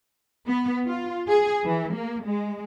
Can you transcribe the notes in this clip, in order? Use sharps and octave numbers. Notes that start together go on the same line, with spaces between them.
B3
F4
G#4
E3
A#3
G#3